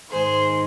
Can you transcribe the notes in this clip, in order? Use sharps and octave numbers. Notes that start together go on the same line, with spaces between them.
G#2 D#3 G#4 C5